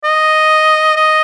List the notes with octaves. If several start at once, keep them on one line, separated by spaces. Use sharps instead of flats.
D#5
D#5